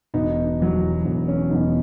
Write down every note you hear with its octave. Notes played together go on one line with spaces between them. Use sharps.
E1 B3 D#4
E2 B2 F#3
E1 B3
C#4
E2 B2 F#3 B3 D#4